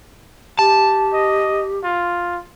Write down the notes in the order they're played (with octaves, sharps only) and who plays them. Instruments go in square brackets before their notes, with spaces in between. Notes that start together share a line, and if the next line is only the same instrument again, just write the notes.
[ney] G4 [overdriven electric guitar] A5
[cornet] D#5
F4